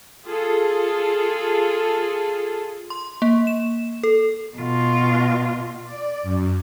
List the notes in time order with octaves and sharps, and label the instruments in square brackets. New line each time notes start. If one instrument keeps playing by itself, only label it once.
[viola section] F4 G#4 A4
[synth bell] C6
A#3
E7
A4
[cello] B2 F4
[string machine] D5
F#2